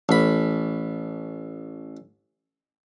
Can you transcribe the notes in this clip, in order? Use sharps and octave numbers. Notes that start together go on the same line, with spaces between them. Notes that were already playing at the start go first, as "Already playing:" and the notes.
A1 B5